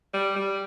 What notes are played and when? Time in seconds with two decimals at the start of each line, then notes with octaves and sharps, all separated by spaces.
0.14 G3
0.36 G3